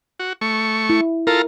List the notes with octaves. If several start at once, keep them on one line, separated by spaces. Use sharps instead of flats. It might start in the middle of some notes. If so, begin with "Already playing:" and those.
F#4
A3 C#6
E4
F4 A4 A#4 A#5